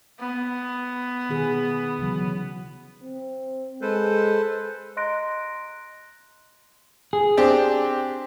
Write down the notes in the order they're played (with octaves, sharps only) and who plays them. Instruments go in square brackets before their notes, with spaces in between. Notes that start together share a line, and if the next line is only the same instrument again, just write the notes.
[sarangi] B3
[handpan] B2 D#3 G#4
C#3 E3 F#3
[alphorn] C4
[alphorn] G#3 [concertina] A4 B4 C5
[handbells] D#5 A#5 C6 F#6 A#6 D7
[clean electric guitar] G#4
[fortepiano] C4 D4 G4